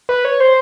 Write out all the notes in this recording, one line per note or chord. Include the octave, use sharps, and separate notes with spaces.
B4
C#5
C5